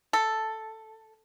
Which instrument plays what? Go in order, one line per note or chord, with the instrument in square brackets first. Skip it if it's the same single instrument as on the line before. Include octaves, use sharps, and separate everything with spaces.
[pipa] A4